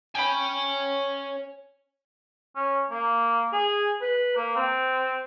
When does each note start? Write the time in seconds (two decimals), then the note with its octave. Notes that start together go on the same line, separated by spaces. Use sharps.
0.15 C#5 G5 G#5 B5
2.56 C#4
2.91 A#3
3.53 G#4
4.02 B4
4.36 A#3
4.56 C4